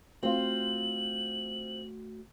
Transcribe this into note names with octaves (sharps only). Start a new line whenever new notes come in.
A3 C4 F4 F#4 F#7